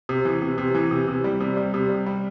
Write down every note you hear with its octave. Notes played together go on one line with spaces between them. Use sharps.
C3
E3
C3
C3
E3
C3
C3
G3
C3
G3
C3
G3
G3